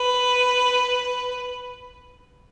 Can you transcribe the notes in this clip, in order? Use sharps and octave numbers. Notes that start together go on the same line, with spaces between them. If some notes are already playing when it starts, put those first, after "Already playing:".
Already playing: B4